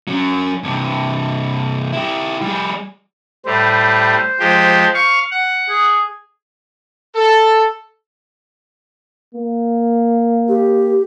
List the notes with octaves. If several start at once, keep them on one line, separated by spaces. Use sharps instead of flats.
F#3 C#4
G2 C3
E4 G4
G3 G#4
A2 G3 C5
F3 G#3 G4
F5 C#6
F#5
G#4
A4
A#3
G4